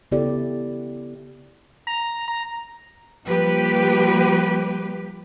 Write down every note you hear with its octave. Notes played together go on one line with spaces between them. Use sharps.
C#3 B3 E4 G4 A4 D5
A#5
A#5
F3 G3 A#3 G4 B4